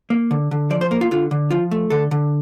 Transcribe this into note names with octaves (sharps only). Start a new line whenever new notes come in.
A#3
D3
D3
F3 D5
C5
A#3 A#4
F4
D3 F4
D3
F3 F4
A3
D3 A4
D3